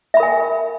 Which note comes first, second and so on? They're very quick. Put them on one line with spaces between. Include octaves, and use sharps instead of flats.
E5 B5 A#4 G#5